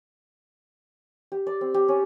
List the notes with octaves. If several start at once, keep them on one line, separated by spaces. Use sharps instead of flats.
G4
D5
C4
G4
C#4